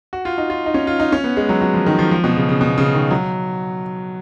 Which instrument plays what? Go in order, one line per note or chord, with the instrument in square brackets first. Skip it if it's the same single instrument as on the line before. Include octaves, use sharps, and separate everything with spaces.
[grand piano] F#4
F4
D#4
F4
D#4
C#4
F4
D#4
C#4
B3
G#3
F#3
F#3
F3
D#3
F3
F3
B2
C#3
C#3
B2
C#3
D#3
F#3